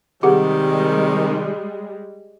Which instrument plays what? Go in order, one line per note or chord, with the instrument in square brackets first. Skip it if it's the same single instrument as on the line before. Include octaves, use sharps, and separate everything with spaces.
[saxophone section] C3 D#3 [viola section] G3 G#3 [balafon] G4 G#4 F#5